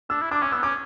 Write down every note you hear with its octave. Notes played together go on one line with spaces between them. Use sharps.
D4 E6
E4
D4 D6
C#4 D6
B3 E6
C#4 D6